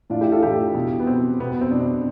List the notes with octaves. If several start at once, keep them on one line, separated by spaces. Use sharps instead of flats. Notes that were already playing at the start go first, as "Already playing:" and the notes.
A2 E3 D4 F4
E4 G4
F4 A4
A2 E3 E4 G4
B2
B3
B2 C4
B2 B3
B3
C4
B2 D4
C4